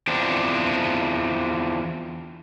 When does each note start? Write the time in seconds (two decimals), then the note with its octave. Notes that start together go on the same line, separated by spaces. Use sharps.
0.08 E2 F3 C4 D4